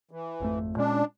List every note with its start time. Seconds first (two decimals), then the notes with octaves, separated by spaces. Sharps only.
0.11 E3
0.40 G#1 F2 A3
0.77 A#2 G#3 C#4 D4